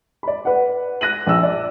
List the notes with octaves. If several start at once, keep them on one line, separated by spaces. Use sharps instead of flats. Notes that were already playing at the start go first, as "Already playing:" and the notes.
D5 B5
B4 F#5
F#6 A#6 D#7 F#7
A#1 E6
D5